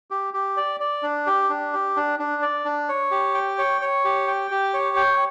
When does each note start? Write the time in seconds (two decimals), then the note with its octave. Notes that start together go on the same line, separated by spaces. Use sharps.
0.11 G4
0.34 G4
0.57 D5
0.80 D5
1.03 D4
1.27 G4
1.49 D4
1.73 G4
1.96 D4
2.19 D4
2.42 D5
2.65 D4
2.89 C#5
3.11 G4
3.34 G5
3.58 C#5
3.81 C#5
4.05 G4
4.28 G5
4.51 G4
4.74 C#5
4.96 G5